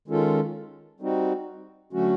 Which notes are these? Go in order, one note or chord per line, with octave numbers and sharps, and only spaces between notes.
D#3 G#3 C#4 F4 A4
G3 C4 D#4 F#4
D3 F#3 A3 C#4 F#4